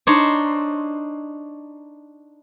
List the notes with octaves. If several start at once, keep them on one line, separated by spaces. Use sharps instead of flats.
D4 D#4 C5 C#5